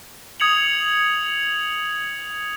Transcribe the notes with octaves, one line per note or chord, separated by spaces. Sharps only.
D#6 G#6 C#7 F7 F#7